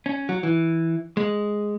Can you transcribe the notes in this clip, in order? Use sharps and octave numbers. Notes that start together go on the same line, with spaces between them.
C#4
F#3
E3
G#3